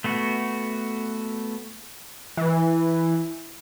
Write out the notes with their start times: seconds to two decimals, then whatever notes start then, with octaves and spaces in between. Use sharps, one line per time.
0.04 A3 B3 F#4
2.37 E3